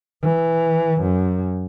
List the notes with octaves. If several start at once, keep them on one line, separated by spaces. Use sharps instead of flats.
E3
F#2